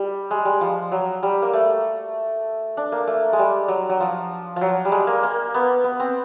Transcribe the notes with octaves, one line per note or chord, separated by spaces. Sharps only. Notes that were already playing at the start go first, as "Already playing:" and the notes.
Already playing: G3
G#3
G3
F3
F#3
G3
A#3
A3
D4
A#3
A3
G#3
G3
F#3
F#3
F3
F3
F#3
G3
G#3
A#3
A#3
B3
B3
C4